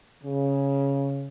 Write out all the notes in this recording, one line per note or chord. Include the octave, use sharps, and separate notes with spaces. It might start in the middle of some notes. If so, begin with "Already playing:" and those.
C#3